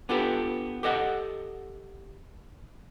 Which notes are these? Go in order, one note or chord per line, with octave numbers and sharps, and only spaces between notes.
B3 D4 F4 G4 A4 B4
G4 A4 D#5 F#5